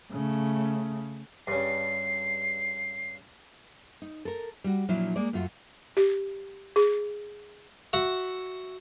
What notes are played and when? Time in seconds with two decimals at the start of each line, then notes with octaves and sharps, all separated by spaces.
0.12 C#3 A3
1.47 G2 C#3 C7
4.02 D#4
4.25 A4 A#4
4.64 G3 F#4
4.89 A#2 F3 F#3 D4 E4
5.16 G#3 A#3 D5
5.33 F#2 A3 F4 F#4
5.97 G4
6.76 G#4
7.93 F#4 E5 F#5